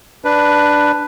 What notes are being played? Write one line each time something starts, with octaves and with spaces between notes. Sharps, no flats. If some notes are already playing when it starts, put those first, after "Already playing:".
D4 B4